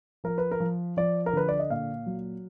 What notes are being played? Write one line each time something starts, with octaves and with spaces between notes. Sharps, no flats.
F3 A#4
B4
A#4
F3
F3 D5
A#4
D3 B4
D5
D#5
A#2 F5
F#3